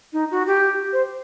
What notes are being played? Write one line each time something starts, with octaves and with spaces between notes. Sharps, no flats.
D#4
F#4
G4
C5